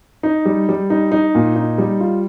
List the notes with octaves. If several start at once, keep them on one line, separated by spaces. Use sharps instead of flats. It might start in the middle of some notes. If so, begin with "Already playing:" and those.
D#4
G3
G3
D#4
D#4
A#2
D#4
G3
F4